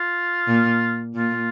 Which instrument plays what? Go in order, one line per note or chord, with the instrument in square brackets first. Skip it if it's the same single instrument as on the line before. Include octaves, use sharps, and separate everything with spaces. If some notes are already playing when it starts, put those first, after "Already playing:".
Already playing: [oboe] F4
[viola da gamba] A#2
[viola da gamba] A#2 [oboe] F4